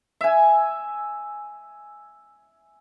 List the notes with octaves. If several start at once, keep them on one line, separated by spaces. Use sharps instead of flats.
E5 G#5